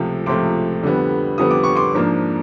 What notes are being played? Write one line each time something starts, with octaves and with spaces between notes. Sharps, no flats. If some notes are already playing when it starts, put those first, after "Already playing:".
Already playing: C#2 C3 F3 A3
C#2 C3 F3 A3 C6 D6
F2 D3 G3 B3
F2 D3 G3 B3 D#6
D6
C#6
C6 D6
G#2 F3 A#3 D4